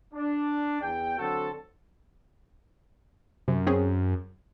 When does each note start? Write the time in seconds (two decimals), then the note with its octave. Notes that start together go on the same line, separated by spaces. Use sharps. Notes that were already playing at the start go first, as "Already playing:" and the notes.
0.14 D4
0.81 E2 G5
1.18 D3 F#3 C4 F#4 A4
3.48 F#2 C3
3.67 C4 C#4 G#4